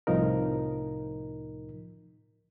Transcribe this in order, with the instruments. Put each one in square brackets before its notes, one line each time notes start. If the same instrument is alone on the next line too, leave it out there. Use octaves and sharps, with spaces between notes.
[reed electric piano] C2 A2 F3 D#4 A#4